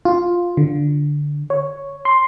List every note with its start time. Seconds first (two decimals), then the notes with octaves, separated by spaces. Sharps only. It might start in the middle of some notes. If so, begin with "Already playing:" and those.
0.05 F4
0.57 D3
1.50 C#5
2.05 C6